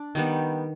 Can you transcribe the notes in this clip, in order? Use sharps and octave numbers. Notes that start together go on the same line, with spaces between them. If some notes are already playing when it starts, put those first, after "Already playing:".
Already playing: D4
D#3 G3 B3